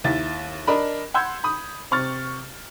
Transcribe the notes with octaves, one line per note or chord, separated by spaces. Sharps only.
D#2 E4 A6
D4 A#4 D#5 B5
F#5 B5 C6 E6 G6 G#6
B5 D#6
C3 C#6 F6 A6